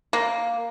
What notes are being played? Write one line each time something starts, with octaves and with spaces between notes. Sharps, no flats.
A#3